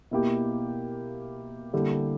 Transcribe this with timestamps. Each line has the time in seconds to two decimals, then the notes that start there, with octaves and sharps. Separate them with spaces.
0.11 B2 A#3 E4 G4
1.73 D3 G3 A#3 E4 G4